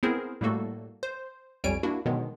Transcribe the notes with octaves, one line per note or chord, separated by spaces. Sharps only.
B3 C4 E4 G#4 A#4 C5
A2 G3 A3 A#3 F#4 A4
C5
B1 F2 G3 C#5 G#5 D7
A#3 D4 E4 F#4
B2 D3 D#3 F#3 G#3 B3